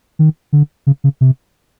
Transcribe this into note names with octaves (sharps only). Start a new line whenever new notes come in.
D#3
D3
C#3
C#3
C3